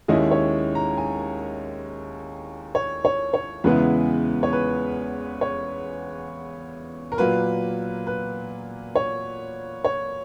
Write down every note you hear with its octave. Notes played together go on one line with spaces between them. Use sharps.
D#2 D#3 G#3 C#4 E4 D#5
C#5
A#5
G#5
C#5
C#5
C#5
E2 C#3 G#3 B3 E4 B4
C#5
B4
C#5
A#4
A#2 F#3 A#3 B4
B4
C#5
C#5